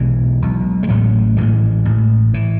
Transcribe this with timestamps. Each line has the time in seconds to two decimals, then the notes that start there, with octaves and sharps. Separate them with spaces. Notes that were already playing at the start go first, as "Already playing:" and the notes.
Already playing: B1 B2 E3 G#3
0.42 B1 B2
0.83 G#3
0.89 A1 A2 F#3 A3
1.37 A1 A2 E3 G#3
1.85 A1 A2
2.34 A2 E3